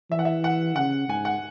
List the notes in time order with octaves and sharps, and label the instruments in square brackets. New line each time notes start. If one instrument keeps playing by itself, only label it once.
[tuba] E3 [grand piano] E5
[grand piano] F#5
E5
F#5
[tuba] C#3 [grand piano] F#5
[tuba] G#2 [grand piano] G#5
[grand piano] F#5